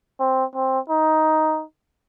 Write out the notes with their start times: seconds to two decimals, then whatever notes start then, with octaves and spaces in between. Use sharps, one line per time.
0.20 C4
0.55 C4
0.90 D#4